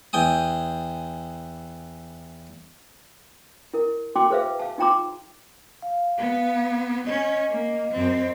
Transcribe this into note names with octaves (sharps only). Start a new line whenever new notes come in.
E2 G5 G#5 D#6
E4 A#4
E4 F#4 G5 A5 C6 D6
G#4 B4 C5 E5 F5
F5 A5
D#4 F4 G5 A#5 C6 D6
F5
B3
C#4 D#5
A#3
F#2 C4